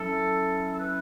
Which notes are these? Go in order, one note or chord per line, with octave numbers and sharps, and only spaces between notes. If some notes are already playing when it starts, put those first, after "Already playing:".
Already playing: F#3 C#4 E4 A4
A4
B4